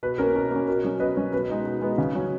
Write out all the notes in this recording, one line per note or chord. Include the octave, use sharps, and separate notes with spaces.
B2 B4
A#3 C#4 A#4
B2
A#3 C#4
B2 A#4
F#3 C#4
B2 B4 D#5
F#3 C#4
B2 B4
G#3 B3 D#4
B2
G#3 B3 D#4
C#3
F#3 C#4